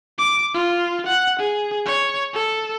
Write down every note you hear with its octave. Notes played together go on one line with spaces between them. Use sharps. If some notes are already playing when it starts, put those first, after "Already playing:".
D6
F4
F#5
G#4
C#5
A4